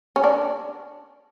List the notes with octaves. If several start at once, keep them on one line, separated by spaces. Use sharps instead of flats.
C#4
D4